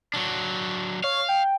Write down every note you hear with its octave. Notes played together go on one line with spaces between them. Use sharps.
F#3 D4
C#5 F5
G5